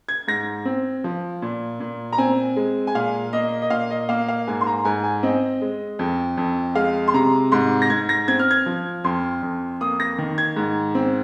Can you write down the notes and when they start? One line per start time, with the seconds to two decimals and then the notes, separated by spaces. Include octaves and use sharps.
0.09 G#6
0.28 G#2 A#6
0.65 C4
1.04 F3
1.42 A#2
1.80 A#2
2.13 A#5
2.18 C4 G#5
2.56 G#3
2.87 G#5
2.95 A#2 F5
3.33 A#3 D#5
3.62 D#5
3.70 A#2 F5
3.91 D#5
4.09 A#3 F5
4.28 F5
4.47 G#2 G#5
4.61 C6
4.67 A#5
4.85 G#2 G#5
5.04 G#5
5.23 C4 D#5
5.62 G#3
5.99 F2
6.37 F2
6.75 G#3 F5
7.08 C6
7.14 C3 A#5
7.52 G#2 C6
7.82 A#6
7.90 G#2 G#6
8.09 A#6
8.28 C4 G#6
8.39 F6
8.51 G#6
8.66 F3
9.04 F2 C6
9.43 F2
9.81 A#3 D#6
10.00 A#6
10.18 D#3
10.38 G#6
10.56 G#2
10.95 C4